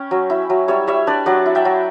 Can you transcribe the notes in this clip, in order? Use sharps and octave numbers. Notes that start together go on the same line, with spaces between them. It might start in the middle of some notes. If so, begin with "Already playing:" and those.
Already playing: C#4 G5 B5
F#3
E4
F#3
G3 C#5 E5
G3 C#5 E5
D4 B4 D5
F#3 D5 F#5
E4
E5 G5
F#3